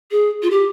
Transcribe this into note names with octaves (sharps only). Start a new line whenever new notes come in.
G#4
F4
G4